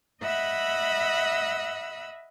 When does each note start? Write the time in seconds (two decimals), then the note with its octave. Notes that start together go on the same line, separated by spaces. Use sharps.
0.22 D#5 E5 F#5 B5 E6